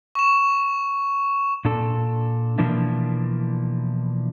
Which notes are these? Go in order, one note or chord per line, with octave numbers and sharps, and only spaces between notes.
C#6 E7
A#2 D4 A4
B2 E3 F3 A#3 D4 E4